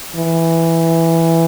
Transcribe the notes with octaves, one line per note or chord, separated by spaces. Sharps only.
E3